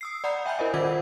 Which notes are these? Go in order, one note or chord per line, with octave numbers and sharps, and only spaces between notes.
D#6 E6 C7
D5 F#5 A#5 B5 G6
E5 G5 G#5 B5 G6
E4 A#4 C5 D#5 E5
D#3 F4 C5 F#5 D6 G#6